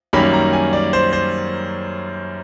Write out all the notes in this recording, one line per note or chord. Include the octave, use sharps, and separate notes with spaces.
F#2 D#3 G3 A#3 C#4 B5
A#5
G#5
D5
C5
C5